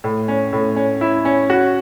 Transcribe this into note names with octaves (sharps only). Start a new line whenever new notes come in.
A2
C#4
A2
C#4
E4
C#4
F#4